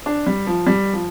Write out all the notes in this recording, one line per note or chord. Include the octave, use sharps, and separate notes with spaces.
D4
G3
F3
G3
F3